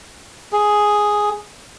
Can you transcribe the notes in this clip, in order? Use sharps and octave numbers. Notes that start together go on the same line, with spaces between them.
G#4